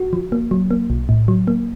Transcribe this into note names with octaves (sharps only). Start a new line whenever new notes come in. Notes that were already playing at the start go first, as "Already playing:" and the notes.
Already playing: F#4
F3
A#3
F#3
A#3
B1
A2
F#3
A#3